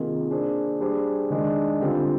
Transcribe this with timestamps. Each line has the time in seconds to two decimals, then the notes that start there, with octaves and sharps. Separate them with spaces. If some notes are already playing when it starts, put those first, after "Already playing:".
Already playing: C3 D#3 A#3 F4 G#4
0.31 A#3 D4 G#4 C5
0.80 G3 D4 G#4 C5
1.30 D#3 G#3 D4
1.80 D3 G3 C4 F4